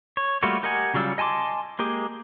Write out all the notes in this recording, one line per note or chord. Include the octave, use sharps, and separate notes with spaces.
C#5
G3 A3 A#3 F4 F#4
G4 A#4 D#5 F#5 G#5
C#3 F#3 G3 F4 E6
D#5 G#5 A5 C6 D6
G#3 A#3 G4 G#4